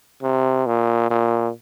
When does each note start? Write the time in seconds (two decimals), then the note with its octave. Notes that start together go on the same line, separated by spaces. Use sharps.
0.23 C3
0.67 A#2
1.10 A#2